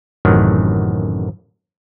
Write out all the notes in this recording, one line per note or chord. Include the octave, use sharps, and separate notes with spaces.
A1 F#2 A2 C3 D#3 F#3